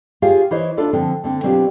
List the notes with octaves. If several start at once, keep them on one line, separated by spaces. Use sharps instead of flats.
F4 G4 G#4 C#5 F5
E3 E4 C5 C#5 D#5
D4 E4 F4 A4 D5
D3 F3 C4
D3 C4
B2 F#3 C4 D4 F4 G4